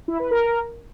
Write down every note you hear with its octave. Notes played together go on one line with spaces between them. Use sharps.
E4
B4
A#4